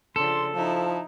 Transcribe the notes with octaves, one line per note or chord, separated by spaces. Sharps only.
C#3 F3 D4 A4 C6
F3 D#4 E4 A5